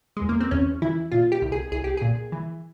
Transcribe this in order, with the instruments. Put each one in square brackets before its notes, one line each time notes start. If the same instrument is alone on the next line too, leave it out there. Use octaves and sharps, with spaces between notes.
[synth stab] E2 G#3
A#3
C4
E2 C#4
E3 E4
A#2 F4
G4
C2
G#4
C2 G#4
G4
A#2 G#4
E3